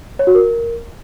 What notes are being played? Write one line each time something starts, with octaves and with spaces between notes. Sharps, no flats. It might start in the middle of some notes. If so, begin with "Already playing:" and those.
C#5
F#4
A#4